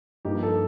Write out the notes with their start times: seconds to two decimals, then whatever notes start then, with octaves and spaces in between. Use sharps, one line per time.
0.25 G2 F3 A#3 D#4 G4
0.43 A4